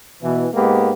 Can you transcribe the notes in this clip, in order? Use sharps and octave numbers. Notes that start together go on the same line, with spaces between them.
B2 E3
G#2 G#3 A#3 B3 G4